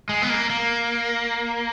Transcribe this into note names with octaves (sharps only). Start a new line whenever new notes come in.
G#3
B3
A#3
A#3